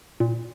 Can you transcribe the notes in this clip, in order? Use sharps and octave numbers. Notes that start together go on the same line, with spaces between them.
A#2